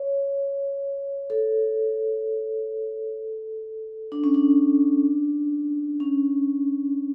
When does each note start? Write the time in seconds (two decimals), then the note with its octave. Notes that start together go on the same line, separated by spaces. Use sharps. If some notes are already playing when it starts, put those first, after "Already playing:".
Already playing: C#5
1.30 A4
4.12 D4
4.24 C#4
4.34 D4
6.00 C#4